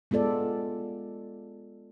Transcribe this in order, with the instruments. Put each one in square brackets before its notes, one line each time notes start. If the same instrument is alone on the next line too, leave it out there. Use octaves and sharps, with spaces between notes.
[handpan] G#3 B3 F4 A4 D5